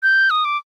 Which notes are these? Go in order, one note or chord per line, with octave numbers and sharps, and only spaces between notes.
G6
D#6
D6